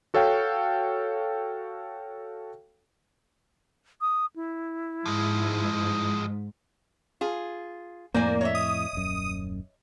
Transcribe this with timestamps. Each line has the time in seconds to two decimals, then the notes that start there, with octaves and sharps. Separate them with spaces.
0.14 F#4 A4 C#5 F5 G5
4.01 D#6
4.36 E4
5.06 G#2 F3 G#3
7.21 F4 G#4
8.14 F2 A2 A#3 C5 D5 G#5
8.41 C#5 D#5 E5
8.55 D#6
8.93 D#1 F#2